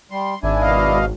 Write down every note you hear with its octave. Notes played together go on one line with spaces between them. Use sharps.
G3 C6
G#1 D4 E4 G#5
B2 D#5 F5